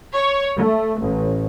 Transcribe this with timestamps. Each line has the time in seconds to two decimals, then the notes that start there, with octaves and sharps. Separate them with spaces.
0.14 C#5
0.57 A3
1.00 A1